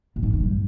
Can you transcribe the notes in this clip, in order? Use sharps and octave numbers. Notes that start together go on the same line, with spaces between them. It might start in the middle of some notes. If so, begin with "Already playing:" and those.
A#2
G#2
G#2
G2